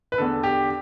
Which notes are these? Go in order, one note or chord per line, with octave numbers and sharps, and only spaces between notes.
B4
E2 D3 A4
G4